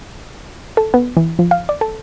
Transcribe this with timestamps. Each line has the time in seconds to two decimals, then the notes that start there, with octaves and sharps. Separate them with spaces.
0.77 A4
0.94 B3
1.17 E3
1.39 F3
1.51 F5
1.69 D5
1.81 A4